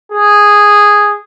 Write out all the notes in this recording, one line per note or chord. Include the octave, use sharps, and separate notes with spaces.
G#4